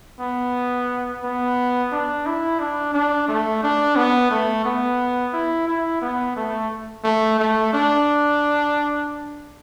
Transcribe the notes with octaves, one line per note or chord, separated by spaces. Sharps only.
B3
B3
D4
E4
D4
D4
A3
D4
B3
A3
B3
E4
E4
B3
A3
A3
A3
D4